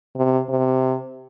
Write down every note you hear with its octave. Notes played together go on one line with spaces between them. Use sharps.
C3
C3